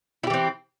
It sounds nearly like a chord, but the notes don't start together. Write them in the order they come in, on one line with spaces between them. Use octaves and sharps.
E4 G4 E3 C4